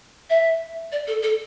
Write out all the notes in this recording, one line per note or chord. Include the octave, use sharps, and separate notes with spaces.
E5
D5
A4
A4